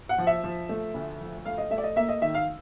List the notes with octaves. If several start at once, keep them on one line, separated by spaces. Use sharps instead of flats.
F#5
F3
E5
F3
A3
D2
F3
A3 F5
D#5
A3 E5
D5
D#5
A#3 E5
D#5
D#3 E5
F5